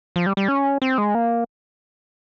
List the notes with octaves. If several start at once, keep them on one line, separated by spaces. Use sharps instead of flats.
F3
G3
G3
C#4
C4
G#3
A#3